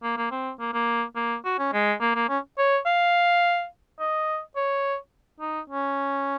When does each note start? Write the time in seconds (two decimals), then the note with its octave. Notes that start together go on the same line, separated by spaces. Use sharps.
0.03 A#3
0.17 A#3
0.31 C4
0.60 A#3
0.73 A#3
1.16 A#3
1.45 F#4
1.59 C#4
1.73 G#3
2.01 A#3
2.15 A#3
2.29 C#4
2.58 C#5
2.86 F5
3.99 D#5
4.56 C#5
5.40 D#4
5.70 C#4